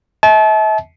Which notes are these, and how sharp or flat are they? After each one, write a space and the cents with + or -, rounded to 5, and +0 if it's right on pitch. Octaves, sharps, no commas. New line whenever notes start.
E5 -40 A5 -35